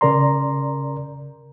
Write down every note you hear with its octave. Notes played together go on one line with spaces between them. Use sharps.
C#3 A#4 D5 A#5 C6